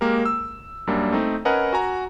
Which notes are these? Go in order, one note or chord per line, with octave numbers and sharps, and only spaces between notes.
G#3 A#3 G4 A#4
E6
F#2 G3 A#3 D4
A3 C4 D#4
C#4 A#4 B4 D#5 F#5 G#5
F#4 G#5 A#5